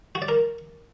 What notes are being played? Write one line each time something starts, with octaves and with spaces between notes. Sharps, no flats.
F#4
D5
A#4